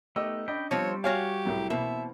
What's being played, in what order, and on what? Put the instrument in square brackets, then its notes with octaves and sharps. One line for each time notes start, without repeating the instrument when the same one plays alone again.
[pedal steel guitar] A3 B3 D#4 [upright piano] G4 D#5 E6
[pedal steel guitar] C#4 G5 B5 [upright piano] D4 D#5
[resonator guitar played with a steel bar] F3 C4 [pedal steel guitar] G3 C#6 [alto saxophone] C#5
[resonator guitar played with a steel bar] F#4 C#5 F5 [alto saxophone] G4 [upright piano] G#5 F6
[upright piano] C2 A2 F#3
[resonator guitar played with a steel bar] B2 [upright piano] E3 A#3 C4 [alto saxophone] E5